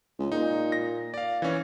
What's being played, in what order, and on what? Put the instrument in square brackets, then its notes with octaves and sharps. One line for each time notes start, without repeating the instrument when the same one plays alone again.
[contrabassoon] C#2
[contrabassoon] A#2 [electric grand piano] D#4
[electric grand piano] A#6
D5 F5
E3 C#4